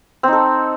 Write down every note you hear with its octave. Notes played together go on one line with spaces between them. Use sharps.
C4 D#4 A4